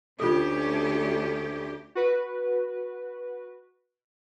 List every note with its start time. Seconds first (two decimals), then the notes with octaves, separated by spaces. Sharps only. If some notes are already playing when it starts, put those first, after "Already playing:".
0.20 D2 C#4 F4 G4 A4
1.95 F#4 B4